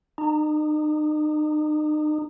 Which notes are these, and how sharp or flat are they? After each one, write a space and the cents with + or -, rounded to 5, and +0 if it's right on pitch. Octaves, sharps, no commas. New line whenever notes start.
D#4 -40